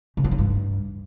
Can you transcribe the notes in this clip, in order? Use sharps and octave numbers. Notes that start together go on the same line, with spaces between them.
C#3
F3
E3
G2